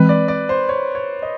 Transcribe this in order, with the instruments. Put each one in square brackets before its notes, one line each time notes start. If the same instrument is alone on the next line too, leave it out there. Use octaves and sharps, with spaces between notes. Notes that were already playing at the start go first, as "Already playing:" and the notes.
Already playing: [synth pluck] E3 G#3 C4 [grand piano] B4
[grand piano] D5
D5
C5
C#5
C#5
D#5